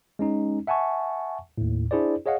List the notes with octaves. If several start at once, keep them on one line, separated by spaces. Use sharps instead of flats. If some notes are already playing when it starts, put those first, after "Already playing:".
G#3 C#4 D#4
E5 F#5 G#5 A5 C#6
D#2 A2
D4 E4 G#4 C5 D5
G#4 C#5 D#5 F5 F#5